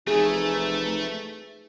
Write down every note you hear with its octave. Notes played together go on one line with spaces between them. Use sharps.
F1 E3 A3 D#4 G#4